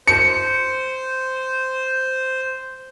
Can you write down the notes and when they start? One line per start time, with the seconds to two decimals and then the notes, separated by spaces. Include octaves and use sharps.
0.07 C5 C#7